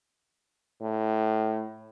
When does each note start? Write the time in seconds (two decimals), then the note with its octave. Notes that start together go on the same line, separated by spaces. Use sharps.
0.81 A2